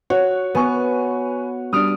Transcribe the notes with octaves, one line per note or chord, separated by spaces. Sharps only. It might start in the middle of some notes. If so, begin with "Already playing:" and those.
F#4 C#5
B3 B4 G#5 C#6
G3 D4 D#6 F6 D7